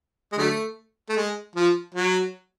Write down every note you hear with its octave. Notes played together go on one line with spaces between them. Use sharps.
G#3
D3 F#3 A3
A3
G#3
F3
F#3